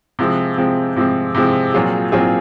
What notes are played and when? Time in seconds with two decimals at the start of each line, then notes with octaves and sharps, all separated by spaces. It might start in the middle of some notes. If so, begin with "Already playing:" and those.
0.19 C3 F3 G#3 C4
0.58 C3 F3 G#3 C4
0.96 C3 F3 G#3 C4
1.35 C3 F3 G#3 C4
1.74 A#2 F#3 C4 F4 G#4
2.12 A#2 F#3 C4 F4 G#4